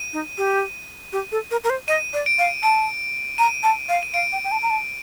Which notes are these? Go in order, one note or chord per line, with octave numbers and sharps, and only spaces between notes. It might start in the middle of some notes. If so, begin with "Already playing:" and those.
Already playing: D#7
D#4
G4
G4
A4
A#4
A#4
C5
D#5 D#7
D5
D7
F5
A5 D7
A#5 D#7
A5
F5
D#7
F5 D7
G5
G5
A5
A#5
A5